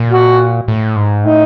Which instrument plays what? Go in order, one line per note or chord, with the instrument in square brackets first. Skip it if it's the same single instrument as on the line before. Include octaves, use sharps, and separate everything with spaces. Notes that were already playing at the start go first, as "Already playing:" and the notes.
Already playing: [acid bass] A#2
[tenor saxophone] F#4
[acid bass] A2
G#2
[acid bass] A2 [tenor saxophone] D#4